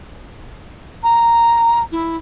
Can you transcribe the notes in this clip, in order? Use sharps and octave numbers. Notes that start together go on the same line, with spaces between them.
A#5
E4